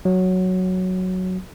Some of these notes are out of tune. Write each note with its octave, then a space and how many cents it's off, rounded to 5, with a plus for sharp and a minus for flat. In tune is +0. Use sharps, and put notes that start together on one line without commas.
F#3 +0